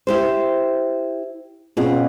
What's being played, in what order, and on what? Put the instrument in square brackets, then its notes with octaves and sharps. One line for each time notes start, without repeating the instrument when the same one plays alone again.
[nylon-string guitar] E4 G4 C5
[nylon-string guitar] B2 G#4 [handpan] C4 C#4 F4